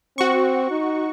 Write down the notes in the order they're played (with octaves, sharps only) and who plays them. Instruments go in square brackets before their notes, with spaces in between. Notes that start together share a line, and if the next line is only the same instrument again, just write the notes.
[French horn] C4 [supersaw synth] F#4 C#6
[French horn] D#4